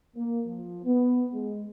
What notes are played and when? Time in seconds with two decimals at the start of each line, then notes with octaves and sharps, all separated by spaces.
0.16 A#3
0.46 F3
0.85 B3
1.33 G#3